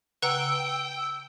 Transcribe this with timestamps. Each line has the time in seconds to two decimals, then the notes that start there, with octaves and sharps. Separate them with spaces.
0.22 C#3 B4 F#5 G5 A#5 E6